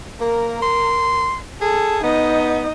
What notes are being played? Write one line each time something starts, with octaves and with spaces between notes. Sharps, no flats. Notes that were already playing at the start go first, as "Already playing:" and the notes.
A#3 A#4
C6
G#4 A4
B3 D#4 D#5